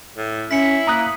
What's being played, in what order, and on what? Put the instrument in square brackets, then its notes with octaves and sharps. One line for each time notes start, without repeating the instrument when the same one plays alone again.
[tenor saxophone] A2
[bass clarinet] C#4 [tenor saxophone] E4 [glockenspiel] B6 C#7
[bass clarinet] A#3 [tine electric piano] A#5 D#6 F#6